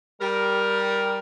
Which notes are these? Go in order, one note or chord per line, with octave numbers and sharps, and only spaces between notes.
G3 A#4